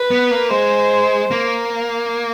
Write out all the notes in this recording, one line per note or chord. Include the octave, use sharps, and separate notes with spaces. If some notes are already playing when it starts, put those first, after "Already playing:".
Already playing: B4
B3
A#3
G#3 C5
A#3